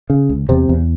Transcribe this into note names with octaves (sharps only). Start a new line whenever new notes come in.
C#3
C#2
E2 C3 C4
E2